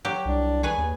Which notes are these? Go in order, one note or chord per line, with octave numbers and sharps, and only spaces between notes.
F#3 G4
C2 D4
G#4 B4 C#5 G#5
D#2